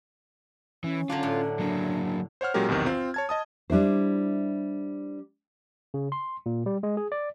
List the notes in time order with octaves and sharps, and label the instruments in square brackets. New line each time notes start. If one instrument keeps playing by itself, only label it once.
[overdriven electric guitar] E3 [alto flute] C#4
[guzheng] D3 F#3 D4 [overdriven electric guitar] F4
[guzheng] A2
[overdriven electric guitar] F#3 A#3 [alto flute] D4
[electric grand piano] C5 C#5 F#5 F6
A#2 F#3 G#3 C#4 G4 A#4
B1 E2 C3 D#3
C4 F4
C#5 A5 G#6
D#5 A5 D#6
[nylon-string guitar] G3 D4 E4 C5
[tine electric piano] C#3
C6
A#2
G3
G#3
G#4
D5